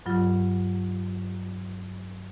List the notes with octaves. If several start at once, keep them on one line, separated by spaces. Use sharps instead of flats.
G2 F#3 F4